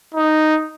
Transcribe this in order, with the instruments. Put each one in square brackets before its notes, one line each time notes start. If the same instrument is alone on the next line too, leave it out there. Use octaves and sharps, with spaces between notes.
[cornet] D#4